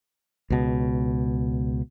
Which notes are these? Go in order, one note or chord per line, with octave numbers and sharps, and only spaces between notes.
C#2 B2